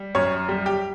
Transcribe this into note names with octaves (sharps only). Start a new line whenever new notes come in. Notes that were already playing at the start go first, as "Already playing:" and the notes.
Already playing: G3
F#2 C#5
G3
G4